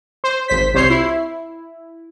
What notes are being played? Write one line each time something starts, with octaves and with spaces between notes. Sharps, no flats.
C5
G#1 C5 B6
C2 C3 C5 C#5 C7
E4